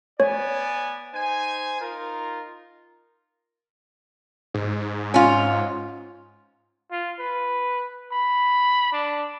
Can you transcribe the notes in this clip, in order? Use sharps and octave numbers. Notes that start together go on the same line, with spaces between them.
B3 C#5 D5 G#5
D#4 C5 G#5
D#4 F4 A#4
G#2
C#4 F4
F4
B4
B5
D4